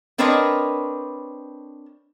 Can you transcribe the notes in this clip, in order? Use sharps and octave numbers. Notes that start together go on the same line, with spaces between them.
C4 D4 A#4 B4 C#5 D#5